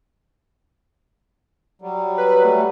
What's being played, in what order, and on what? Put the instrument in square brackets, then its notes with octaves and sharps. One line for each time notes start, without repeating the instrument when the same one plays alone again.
[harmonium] F#3 G3
[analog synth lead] B4
A3